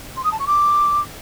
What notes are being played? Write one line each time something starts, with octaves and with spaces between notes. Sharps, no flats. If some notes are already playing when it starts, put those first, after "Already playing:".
C6
D#6
A5
C#6
D6